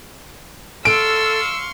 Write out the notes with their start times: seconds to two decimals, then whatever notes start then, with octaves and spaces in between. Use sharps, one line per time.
0.85 A4 F5 C6 C#6 E6 D7